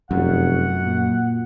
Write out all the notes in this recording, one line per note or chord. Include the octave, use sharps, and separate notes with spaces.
F1 F#2 F#5
A#2